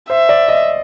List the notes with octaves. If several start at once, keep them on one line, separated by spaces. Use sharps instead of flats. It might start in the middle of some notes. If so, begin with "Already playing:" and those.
C5 E5
D5
D#5